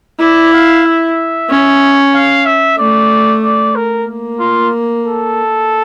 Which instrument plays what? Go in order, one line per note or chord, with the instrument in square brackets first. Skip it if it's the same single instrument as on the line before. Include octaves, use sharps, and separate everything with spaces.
[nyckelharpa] E4 [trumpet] D5
[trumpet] F5
E5
[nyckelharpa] C#4
[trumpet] F5
E5
[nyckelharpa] A3 [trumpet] D5
[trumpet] D5
A#4
[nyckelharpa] A#3
[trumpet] F4
A4